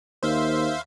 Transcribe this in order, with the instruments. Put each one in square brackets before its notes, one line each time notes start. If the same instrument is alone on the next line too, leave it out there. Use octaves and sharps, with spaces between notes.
[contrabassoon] D#2 [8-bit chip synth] C5 E5 F5